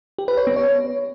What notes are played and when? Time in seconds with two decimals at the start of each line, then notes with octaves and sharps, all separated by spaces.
0.18 G4
0.28 B4
0.37 C#5
0.47 B3
0.56 C#5